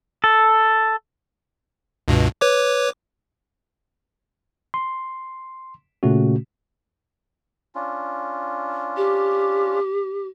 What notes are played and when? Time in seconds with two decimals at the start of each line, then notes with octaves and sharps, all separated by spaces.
0.24 A4
2.08 C#2 G2 B2
2.41 B4 C#5 D6
4.74 C6
6.03 A#2 C#3 A3 C#4 F#4
7.75 C#4 D4 F4
8.97 G4